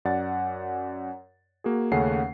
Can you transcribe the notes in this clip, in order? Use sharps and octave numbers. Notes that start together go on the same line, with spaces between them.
F#2 D5 F#5 A6
A#3 F#4 G#4
D#2 C#3 A3 C#4 F#5 C7